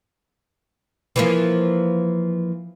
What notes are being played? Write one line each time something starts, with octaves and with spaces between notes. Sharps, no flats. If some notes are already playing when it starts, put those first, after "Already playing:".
E3 F3 A#3